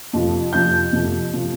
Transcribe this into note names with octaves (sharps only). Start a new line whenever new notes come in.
F2 C3 F3
F2 C3 F3 G6
F2 C3 F3
C3 F3